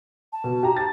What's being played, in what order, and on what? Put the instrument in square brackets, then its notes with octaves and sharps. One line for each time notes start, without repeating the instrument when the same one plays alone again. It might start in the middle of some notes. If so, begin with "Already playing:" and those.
[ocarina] A5
[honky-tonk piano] B2
G4 A#5
A6